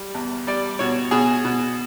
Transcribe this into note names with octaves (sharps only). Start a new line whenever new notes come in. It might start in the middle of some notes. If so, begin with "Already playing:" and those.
Already playing: G3
E2
G3 D5
B2 C#5
B2 G#4
B2